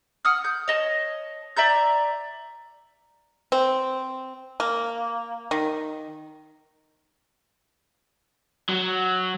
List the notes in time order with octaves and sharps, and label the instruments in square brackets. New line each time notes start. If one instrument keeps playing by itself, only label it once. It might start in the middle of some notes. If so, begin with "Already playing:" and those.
[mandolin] F#5 D#6 F6
G6
C#5 D#5 A5
D5 E5 A#5 G6
[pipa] C4
A#3
D#3
[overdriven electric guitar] F#3